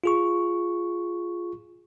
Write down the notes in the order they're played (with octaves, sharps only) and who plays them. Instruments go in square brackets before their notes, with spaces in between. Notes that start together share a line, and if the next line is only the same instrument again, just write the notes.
[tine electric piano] F4 G#4 C#6